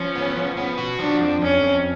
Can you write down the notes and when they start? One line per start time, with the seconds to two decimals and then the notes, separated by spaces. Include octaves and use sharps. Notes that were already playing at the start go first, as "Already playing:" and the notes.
Already playing: F3 C#4
0.15 B3
0.36 F3
0.57 B3
0.78 F#4
0.99 F3 D4
1.21 F2
1.42 F2 C#4
1.62 F2